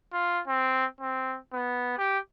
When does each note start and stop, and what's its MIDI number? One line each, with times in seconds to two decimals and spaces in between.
0.13 0.40 65
0.48 0.85 60
1.00 1.37 60
1.53 1.97 59
1.98 2.19 67